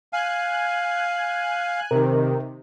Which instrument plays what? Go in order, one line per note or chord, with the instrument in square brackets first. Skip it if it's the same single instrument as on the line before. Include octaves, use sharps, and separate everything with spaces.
[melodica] F5 [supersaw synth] G#5 F#6
[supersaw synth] C3 D#3 [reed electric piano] A#4